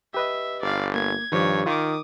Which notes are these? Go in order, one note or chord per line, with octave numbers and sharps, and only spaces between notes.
G4 B4 D#5 E5
G1 D5 F5
A#3 G#6
G2 D#3 F3 G4 C#5
D#3 F4 D6 D#6